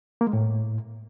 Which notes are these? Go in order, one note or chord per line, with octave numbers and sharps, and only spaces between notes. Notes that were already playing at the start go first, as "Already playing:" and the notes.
A#3
G#3
A2